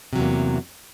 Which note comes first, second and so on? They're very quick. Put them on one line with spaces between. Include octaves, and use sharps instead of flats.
C3 F#3 E2 A#3